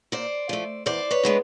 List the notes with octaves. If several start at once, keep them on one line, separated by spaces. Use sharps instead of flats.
A#2 C5 D5
F3 A3
E2 C5 D5
B4 C#5
B2 G#3 B3 D4